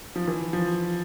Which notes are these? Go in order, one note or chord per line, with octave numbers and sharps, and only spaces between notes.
F3
E3
F3